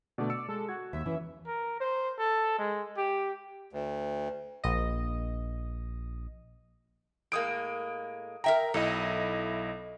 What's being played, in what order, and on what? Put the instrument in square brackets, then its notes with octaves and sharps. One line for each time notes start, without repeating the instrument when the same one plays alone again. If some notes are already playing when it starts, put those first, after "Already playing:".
[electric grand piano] B2 D3 A3 [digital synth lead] D5
[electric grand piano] E6 C#7
[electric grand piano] G#3 [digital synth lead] A4
[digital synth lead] F#4 [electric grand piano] G#6
[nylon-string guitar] D#2 [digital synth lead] E5
[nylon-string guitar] E3 [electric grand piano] C#4
[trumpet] A#4
C5
A4
G#3
G4
[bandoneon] D2
[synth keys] A#1 D#5
[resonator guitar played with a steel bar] A2 G#3 A#3 [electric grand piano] D#6 D7
[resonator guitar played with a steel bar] A#4 E5 G5 [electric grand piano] A#5
[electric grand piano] B1 E4 D#5 [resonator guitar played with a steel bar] A4